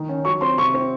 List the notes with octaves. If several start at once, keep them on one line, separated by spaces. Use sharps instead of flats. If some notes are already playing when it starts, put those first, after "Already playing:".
Already playing: D#3 D#4
C#4
F#3 C#6
C4 C6
C3 C#6
C4